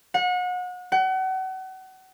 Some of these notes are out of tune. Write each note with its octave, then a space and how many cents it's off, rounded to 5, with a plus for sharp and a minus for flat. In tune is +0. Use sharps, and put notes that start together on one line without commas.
F#5 -35
F#5 +35